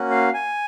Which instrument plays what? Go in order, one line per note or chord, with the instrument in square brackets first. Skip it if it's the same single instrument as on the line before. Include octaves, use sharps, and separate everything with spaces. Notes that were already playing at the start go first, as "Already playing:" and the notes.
Already playing: [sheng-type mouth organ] A#3 C#4 F#4
F5
G#5